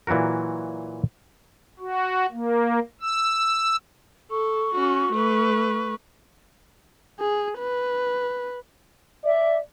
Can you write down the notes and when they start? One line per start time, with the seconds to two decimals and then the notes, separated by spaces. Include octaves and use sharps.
0.07 A#2 E3 F#3 F#4 A#4
1.79 F#4
2.32 A#3
3.01 E6
4.31 A4 C#6
4.74 C#4 F#4
5.13 A3 B4
7.20 G#4
7.59 B4
9.24 D5 E5